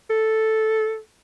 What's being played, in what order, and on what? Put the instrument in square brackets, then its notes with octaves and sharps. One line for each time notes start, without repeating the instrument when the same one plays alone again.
[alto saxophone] A4